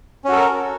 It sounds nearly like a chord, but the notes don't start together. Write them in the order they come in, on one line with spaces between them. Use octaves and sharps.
C#4 F#4 A4 A#4